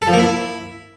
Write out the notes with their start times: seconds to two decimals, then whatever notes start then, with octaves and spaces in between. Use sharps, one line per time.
0.02 A4
0.07 F3
0.13 A#3
0.18 E4